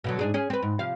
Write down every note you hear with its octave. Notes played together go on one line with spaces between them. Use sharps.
B2 D3 F#3
G#2 D4 G#4
C#4 G#4
C4 B4
G#2
C3 F3 F5